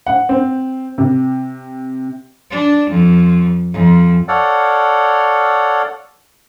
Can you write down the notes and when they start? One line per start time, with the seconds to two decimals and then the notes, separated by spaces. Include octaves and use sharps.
0.07 F#5
0.29 C4
0.98 C3
2.51 D4
2.90 F2
3.73 F2
4.28 A4 C#5 D5 F5 F#5